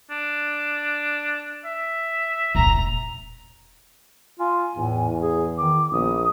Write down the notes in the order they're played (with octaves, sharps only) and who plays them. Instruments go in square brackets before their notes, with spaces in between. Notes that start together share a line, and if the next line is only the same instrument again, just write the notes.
[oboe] D4
E5
[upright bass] E1 A#2 [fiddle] A#5
[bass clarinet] F4 [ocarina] G#5
[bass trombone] E2 [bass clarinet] A2
[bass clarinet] G#4
[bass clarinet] D#3 [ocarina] D6
[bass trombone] A#1 [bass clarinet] B3 [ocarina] D#6